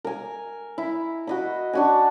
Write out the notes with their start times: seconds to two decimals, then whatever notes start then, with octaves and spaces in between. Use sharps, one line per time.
0.05 A#4 G#5
0.78 E4
1.27 F#4 D#5 B5
1.73 D4 F#4 G#5